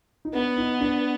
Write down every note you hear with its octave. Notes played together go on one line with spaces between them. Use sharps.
D#4
B3 D4
D#4
D4